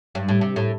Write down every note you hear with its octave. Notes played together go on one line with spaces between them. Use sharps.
G2
A2
C3
A2